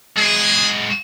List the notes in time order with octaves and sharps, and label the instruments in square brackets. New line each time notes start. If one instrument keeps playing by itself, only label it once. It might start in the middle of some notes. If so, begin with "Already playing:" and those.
[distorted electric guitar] G#3 F#4 [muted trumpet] G#4